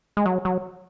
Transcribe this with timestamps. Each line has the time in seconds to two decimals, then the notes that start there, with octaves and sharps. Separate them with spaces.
0.17 G#3
0.26 F#3
0.45 F#3